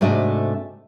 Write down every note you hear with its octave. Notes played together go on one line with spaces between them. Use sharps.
G#2 C3 A3 D4 F#4 D#5